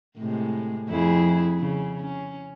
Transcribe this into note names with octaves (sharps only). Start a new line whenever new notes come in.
A2 C3 G#3
F2 E4 G#4
C#3
C#4